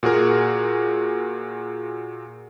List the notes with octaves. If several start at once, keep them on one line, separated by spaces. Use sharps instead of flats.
A#2 F#4 G#4 A#4